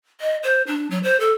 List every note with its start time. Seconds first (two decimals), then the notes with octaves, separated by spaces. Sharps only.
0.21 D#5
0.43 C5
0.67 D4
0.90 F#3
1.03 C5
1.20 A4